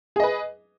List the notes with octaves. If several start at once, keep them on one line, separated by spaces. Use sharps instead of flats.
G#4 B4 D#5